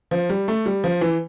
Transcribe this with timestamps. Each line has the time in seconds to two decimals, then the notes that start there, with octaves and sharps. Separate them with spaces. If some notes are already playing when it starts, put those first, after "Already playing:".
0.11 F3
0.29 G3
0.48 A3
0.66 G3
0.84 F3
1.01 E3